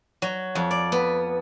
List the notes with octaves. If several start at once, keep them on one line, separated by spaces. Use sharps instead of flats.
F#3
F2
D5
B3